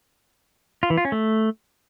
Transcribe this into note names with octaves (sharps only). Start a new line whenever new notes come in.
F4
E3
F4
C#4
A3